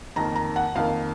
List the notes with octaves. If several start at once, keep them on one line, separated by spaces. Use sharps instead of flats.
F2 D#3 A#3 A#5
A#5
F#5
F2 D#3 A#3 F5